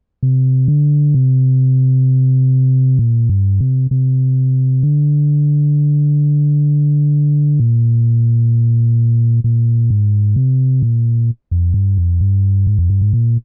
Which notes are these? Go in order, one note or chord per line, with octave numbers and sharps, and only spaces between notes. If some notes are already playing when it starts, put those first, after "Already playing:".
C3
D3
C3
A#2
G2
C3
C3
D3
A#2
A#2
G#2
C3
A#2
F2
G2
F2
G2
G#2
F2
G2
G#2
A#2